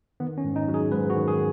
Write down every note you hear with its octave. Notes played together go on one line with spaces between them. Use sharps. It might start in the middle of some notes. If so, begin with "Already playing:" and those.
D#3 B3
C#4
G#2
D#4
F#3
G#4
G#2 B4
F#4
D#3
G#4